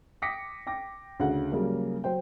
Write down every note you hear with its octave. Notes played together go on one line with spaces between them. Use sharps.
G5 D6 D#6 A#6 B6 C#7
G5 D6 A#6
D2 C#3 F#5
C#3 F#3 G3 A#3
F#3 C5 G5